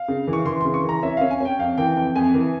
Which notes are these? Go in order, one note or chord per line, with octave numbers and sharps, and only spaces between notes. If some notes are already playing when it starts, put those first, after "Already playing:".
Already playing: F5
C#3
E3
C#6
E3 C6
C#3 C6
C#6
E3
A#5
C#4 E5
C#4 F5
G#5
C#4 G5
F2 F5
E3 G5
F2 G5
F2 G#5
E3